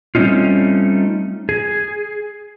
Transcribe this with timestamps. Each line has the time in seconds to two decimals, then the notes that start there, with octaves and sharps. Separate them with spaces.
0.15 G3 A3 C4 C#4 D#4 F4
1.49 G#4